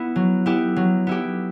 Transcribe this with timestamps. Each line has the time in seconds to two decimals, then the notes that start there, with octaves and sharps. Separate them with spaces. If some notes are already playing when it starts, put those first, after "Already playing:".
Already playing: B3 E4
0.16 F#3
0.46 B3 E4 G4
0.76 F#3
1.07 B3 E4 G4